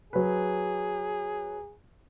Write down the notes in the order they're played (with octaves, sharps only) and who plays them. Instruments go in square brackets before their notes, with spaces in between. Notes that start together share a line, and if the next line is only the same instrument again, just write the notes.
[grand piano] F#3 B4 [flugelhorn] G#4